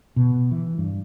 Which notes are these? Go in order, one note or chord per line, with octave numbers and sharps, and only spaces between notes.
B2
E3
G2